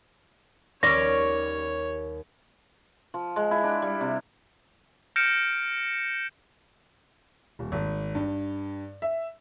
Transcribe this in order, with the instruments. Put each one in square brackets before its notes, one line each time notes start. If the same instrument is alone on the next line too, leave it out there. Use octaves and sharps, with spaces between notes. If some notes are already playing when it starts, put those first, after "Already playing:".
[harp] D#2 G3 [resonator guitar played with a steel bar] C#4 D5 [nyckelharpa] C#5 [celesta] A#6
[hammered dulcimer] F3
G#3
E4
D4
G3
C3
[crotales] F6 G6 A#6 C#7 D7 E7
[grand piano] D#1
G#1
G2
E5